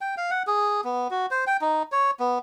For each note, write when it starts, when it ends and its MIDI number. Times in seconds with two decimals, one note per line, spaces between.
0.01 0.15 79
0.17 0.30 77
0.30 0.43 78
0.47 0.81 68
0.84 1.08 59
1.11 1.26 66
1.31 1.45 72
1.47 1.57 79
1.61 1.83 63
1.92 2.11 73
2.20 2.39 59